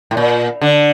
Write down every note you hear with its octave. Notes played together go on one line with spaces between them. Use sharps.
A2
A#2
D3